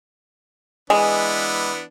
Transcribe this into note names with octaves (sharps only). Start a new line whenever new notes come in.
E3 G#3 B3 D4